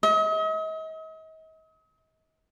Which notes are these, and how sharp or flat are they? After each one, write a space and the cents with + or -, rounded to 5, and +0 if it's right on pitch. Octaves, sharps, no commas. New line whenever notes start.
D#5 +40